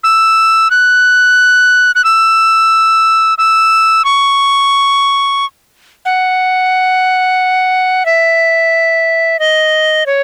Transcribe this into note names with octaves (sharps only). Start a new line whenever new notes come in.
E6
F#6
F#6
E6
E6
C#6
F#5
E5
D#5
C#5